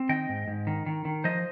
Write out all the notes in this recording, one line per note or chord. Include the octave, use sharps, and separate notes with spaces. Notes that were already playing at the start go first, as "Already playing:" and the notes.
Already playing: C4
D#3 D#5 G5
G#2
G#2
D#3
D#3
D#3
F3 C5 D#5